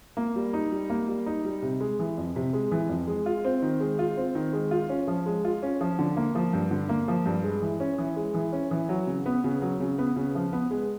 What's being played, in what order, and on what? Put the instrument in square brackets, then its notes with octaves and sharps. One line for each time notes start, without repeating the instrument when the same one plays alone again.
[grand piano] A#3
G3
D#4
G3
A#3
G3
D#4
G3
C3
G#3
E3
F2
C3
G#3
E3
F2
G#3
F4
C4
D#3
G#3
F4
C4
D#3
G#3
F4
C#4
F3
G#3
F4
C#4
F3
D3
A#3
F3
G2
D3
A#3
F3
G2
G#3
E3
C#4
E3
G#3
E3
C#4
E3
F#3
C#3
B3
C#3
F#3
C#3
B3
C#3
F3
B3
G#3